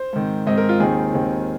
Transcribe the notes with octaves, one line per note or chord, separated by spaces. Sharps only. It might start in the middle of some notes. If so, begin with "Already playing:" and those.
Already playing: C5
G#2 D#3 C4
G#2 D#3 C4 D#5
A#4
F4
D#2 D#3 C4 G#4
D#2 D#3 C4